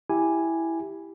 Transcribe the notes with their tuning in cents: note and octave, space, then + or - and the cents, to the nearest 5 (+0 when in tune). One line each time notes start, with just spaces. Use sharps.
E4 +0 G4 +0 G#5 +0